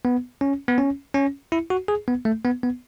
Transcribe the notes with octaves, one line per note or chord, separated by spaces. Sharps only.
B3
C#4
B3
C#4
C#4
E4
F#4
G#4
B3
A3
B3
B3